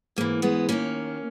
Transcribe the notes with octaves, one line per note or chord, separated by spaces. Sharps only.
G#2 E3 A#3
G#3 B3
D#2 D#3 A#3 C#4